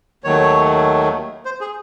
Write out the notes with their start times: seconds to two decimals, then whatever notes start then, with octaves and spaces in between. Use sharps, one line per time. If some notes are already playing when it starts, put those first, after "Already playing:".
0.24 D#2 D#3 F#3 A3 C#5
1.45 C5
1.61 G#4